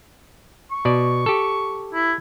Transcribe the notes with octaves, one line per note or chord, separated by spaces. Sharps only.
C#6
B2 D5
G4 A4
E4